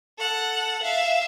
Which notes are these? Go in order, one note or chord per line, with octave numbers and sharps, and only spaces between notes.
A4 F#5
E5 F5